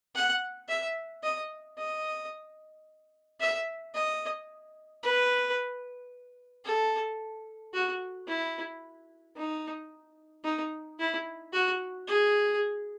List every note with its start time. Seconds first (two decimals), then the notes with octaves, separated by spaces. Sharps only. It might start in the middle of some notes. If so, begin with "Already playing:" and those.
0.15 F#5
0.68 E5
1.23 D#5
1.77 D#5
3.40 E5
3.94 D#5
5.03 B4
6.65 A4
7.73 F#4
8.27 E4
9.37 D#4
10.44 D#4
10.99 E4
11.53 F#4
12.07 G#4